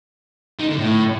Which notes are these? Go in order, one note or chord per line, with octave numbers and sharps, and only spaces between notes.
D#3
D3
A2